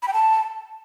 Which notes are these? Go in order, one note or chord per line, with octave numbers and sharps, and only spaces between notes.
B5
G5
A5